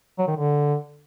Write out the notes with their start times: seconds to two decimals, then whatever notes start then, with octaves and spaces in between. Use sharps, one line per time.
0.19 F#3
0.27 D#3
0.36 D3